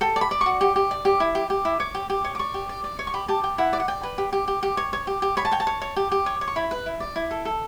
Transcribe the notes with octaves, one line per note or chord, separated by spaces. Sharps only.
A4 G5
D5
B5
D5
C#6
F#4
G4
G4
D5
G4
E4
G4
G4
E4
C#5 D6
G4
G4
C#5
D6
D5 C#6
G4
D5
D5
C#5
C#6
G4 B5
G4 A5
G4 G5
E4 F#5
D5
F#5
D5 G5
B4
G4
G4
G4
G4
C#5
C#5
G4
G4
C#5 B5
A5
C#5 G5
A5
C#5
C#5
G4
G4
C#5
C#5
C#6
E4 B5
B4
E4
D5
E4
A4
A4